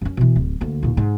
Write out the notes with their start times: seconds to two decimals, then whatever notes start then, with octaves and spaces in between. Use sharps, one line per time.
0.01 F#2 C#4
0.17 B2 E3
0.36 D1
0.61 D2 A#3
0.83 D#2 A#2
0.97 G#2